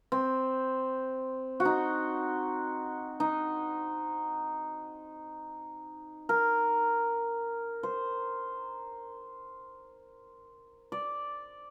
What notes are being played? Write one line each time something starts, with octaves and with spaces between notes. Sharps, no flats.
C4
F#4
D#4
D#4
A#4
C5
D5